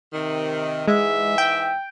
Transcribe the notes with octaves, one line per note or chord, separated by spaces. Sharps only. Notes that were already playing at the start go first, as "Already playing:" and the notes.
C3 D#3
G#2 E3 G#3 E5
G5